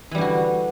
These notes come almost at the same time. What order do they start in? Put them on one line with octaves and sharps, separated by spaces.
E3 G3 D3 F#4